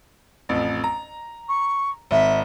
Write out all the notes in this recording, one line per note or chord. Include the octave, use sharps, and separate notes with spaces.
A1 F2
A#5
C#6
G#1 E5